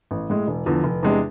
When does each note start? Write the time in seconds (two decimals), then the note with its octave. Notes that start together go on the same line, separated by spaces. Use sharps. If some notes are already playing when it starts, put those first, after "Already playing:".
0.11 A1
0.30 A2 G#3
0.48 E1
0.66 E2 D3 F3
0.84 F1
1.03 E2 C3 G#3 D4